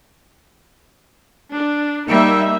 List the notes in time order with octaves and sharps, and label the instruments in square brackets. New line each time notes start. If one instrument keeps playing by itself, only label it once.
[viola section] D4
[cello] G3 [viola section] A#3 D#4 E5